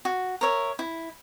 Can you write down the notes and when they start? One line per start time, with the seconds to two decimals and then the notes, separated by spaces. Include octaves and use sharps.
0.05 F#4
0.41 A#4 C#5 E5
0.79 E4